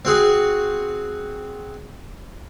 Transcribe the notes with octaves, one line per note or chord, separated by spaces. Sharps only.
C4 F#4 G#4